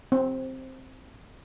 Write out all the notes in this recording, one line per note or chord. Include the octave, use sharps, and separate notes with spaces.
C4